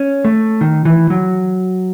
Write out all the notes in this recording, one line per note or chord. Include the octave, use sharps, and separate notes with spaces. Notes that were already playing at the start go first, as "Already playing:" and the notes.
Already playing: C#4
A3
D#3
E3
F#3